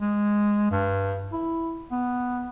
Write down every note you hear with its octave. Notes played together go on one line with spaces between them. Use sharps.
G#3
G2
E4
B3